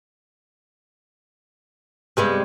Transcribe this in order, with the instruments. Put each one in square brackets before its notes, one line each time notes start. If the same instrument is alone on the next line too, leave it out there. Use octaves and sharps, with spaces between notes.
[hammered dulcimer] G2 [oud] C3 G#3 B3